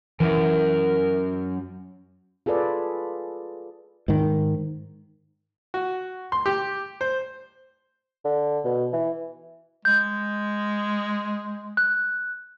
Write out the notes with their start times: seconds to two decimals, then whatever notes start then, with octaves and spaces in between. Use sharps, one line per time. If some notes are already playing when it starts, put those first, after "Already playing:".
0.20 F#2 E3 A#4
2.46 F4 G#4 A4 B4 D5
4.08 G#2 D#3
5.74 F#4
6.32 C6
6.46 G4
7.01 C5
8.25 D3
8.64 B2
8.93 E3
9.85 G#3 G6
11.77 F#6